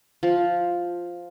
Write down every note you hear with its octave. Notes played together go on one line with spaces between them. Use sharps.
F3